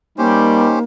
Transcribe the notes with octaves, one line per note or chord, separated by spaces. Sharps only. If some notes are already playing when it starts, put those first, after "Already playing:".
G3 A#3 C#4 D#4 G4 C5